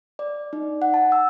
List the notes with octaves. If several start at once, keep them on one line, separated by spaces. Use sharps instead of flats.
D5
D#4
F#5
A5
E6